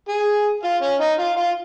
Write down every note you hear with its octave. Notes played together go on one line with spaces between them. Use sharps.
G#4 G#5
F4 F5
C#4 C#5
D#4 D#5
F4 F5
F4 F5